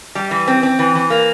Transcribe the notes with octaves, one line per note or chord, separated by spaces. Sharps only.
G3
E3
C4
C4
E3
E3
A#3